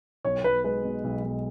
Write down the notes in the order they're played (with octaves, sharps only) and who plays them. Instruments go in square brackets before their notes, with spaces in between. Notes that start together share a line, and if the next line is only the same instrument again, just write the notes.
[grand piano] B1 [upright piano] C#5
[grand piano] B1 [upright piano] B4
[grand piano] G#3 [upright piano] B4
[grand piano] B2
B1
B1